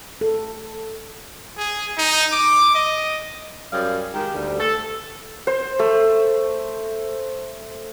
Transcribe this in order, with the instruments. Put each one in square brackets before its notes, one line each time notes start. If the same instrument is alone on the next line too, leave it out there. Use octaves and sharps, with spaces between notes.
[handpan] A4
[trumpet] G#4
D#4
D6
D#5
[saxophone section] F#2 G3 C#4 G#4 D5 F5
D#3 G#3 G4
D2 G3
A4
[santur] C5
A3